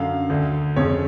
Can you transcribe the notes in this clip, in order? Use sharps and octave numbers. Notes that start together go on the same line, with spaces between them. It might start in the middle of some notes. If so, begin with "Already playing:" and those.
Already playing: F#2 D3 F5
D2 D3
F2 C#3 C#5